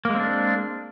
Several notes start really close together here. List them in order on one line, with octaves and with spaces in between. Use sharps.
A#3 G#3 C4 D4